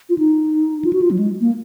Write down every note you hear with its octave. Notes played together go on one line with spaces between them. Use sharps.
F4
D#4
F4
F#4
F4
F#3
G#3
A#3